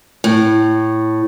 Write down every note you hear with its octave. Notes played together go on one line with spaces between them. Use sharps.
A2